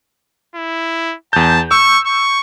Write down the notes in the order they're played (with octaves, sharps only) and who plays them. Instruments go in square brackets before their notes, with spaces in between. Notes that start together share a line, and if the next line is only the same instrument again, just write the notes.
[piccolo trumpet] E4
[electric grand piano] E2 G6 [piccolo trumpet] A5
[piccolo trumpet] C#6 [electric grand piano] E6
[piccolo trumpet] C#6